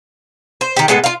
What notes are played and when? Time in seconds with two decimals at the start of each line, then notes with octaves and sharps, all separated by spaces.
0.61 C5
0.76 D#3 G4
0.88 A2 G#3 B3 A4
1.04 F4 F5